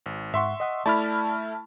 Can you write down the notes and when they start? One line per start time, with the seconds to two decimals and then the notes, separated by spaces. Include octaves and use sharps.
0.06 G#1
0.34 G#2 E5 F#5 C6 C#6
0.60 D#5 F#5 D#6
0.86 A3 E4 D5 A5 B5 F6